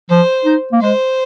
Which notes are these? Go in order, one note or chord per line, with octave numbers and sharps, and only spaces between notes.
F3 C5
D#4
A#3
G#3 C5